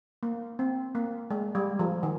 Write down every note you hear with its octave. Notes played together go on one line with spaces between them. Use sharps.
A#3
C4
A#3
G#3
G3
F3
D#3